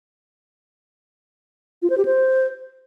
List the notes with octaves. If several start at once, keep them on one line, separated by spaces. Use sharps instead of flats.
F4
C5
G4
C5